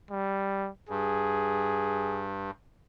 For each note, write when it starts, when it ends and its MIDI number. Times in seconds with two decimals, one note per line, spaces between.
0.11 0.69 55
0.89 2.51 43
0.89 2.28 68